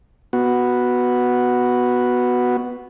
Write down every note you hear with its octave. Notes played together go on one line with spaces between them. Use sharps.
B3 F#4